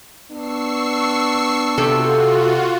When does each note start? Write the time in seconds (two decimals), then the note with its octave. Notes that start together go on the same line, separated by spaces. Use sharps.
0.31 B3 D4 C#6 E6 C7
1.78 C3 F4 F#4 A4